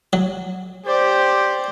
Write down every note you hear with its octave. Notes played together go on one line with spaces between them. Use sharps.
F#3
G4 C5 D5